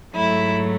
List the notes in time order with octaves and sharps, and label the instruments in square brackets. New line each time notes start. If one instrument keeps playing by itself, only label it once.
[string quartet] G#2 F#3 A3 E4